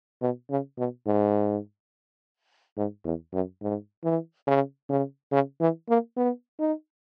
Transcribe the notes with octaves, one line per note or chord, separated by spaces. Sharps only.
B2
C#3
B2
G#2
G#2
E2
F#2
G#2
E3
C#3
C#3
C#3
E3
A#3
B3
D#4